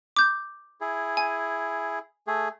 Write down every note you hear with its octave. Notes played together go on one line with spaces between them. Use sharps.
D6 G6
E4 G#4
G#5
A3 G#4